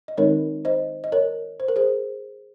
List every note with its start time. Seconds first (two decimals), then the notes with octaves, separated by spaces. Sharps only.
0.08 D#5
0.18 D#3 G#3 C4 D#4 A#4 C#5
0.65 C5 D#5
1.04 D#5
1.12 A#4 C#5
1.60 C5
1.68 A#4
1.76 G#4 C5